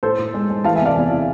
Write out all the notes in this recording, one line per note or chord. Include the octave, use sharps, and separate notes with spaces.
A2 A4 C5
A2
G#3
G#3
E3 F5 A5
E5 G#5
C3 D5 F5
E2
E3